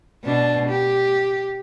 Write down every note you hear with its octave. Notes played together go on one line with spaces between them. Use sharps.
B2 D4
G4